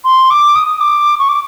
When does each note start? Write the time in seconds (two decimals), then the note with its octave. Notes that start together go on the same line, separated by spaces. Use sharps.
0.04 C6
0.30 D6
0.56 D#6
0.81 D6
1.19 C#6
1.29 D6